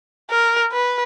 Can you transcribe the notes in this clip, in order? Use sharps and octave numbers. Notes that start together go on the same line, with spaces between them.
A#4
B4